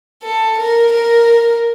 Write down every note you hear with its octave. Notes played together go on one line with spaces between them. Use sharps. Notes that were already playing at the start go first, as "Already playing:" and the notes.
A4
A#4
A#4